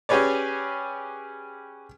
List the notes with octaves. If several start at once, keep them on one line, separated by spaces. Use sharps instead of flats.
C#4 G4 G#4 B4 C#5 D5